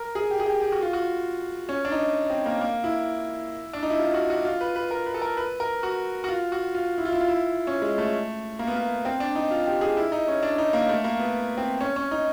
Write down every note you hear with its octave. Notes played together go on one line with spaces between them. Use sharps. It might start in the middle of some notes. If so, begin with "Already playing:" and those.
Already playing: A#4
G#4
G4
G#4
G4
G4
F#4
F4
F#4
C#4
D4
D#4
C4
A#3
A#3
E4
D4
D#4
E4
F4
F#4
F#4
F4
B4
B4
A#4
B4
A4
A#4
B4
A#4
F#4
F#4
F4
F#4
F4
E4
F4
E4
F4
E4
C#4
G#3
A3
A#3
B3
A#3
C4
D4
D#4
F4
G4
G#4
E4
D#4
C#4
D4
D#4
A#3
A3
A#3
B3
C4
C#4
C#4
D#4